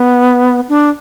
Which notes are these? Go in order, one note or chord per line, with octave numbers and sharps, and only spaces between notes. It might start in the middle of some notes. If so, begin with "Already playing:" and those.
Already playing: B3
D4